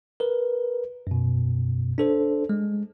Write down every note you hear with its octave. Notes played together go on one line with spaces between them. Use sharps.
A#4 B4
F#2 B2
D4 A4 C5
G#3